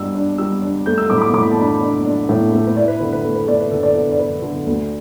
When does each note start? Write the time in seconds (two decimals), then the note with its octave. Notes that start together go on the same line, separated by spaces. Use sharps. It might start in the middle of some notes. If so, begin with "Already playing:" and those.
Already playing: G2 G3 D4 E6
0.15 D4
0.38 G3 E6
0.62 D4
0.86 A3 G6
0.98 E6
1.10 A2 D6
1.18 B5
1.22 D6
1.33 A2 D6
1.43 B5
1.52 A5
1.58 D4 B5
1.81 D4
2.05 D4
2.29 A2
2.53 A3 A4
2.67 B4
2.76 E4 D5
2.88 B4
3.00 D3 B4
3.12 B4
3.24 A3
3.35 B4
3.47 A3 D5
3.60 B4
3.71 D3 A4
3.83 D5
3.95 D3 B4
4.12 D5
4.19 D3 B4
4.42 D3
4.67 D2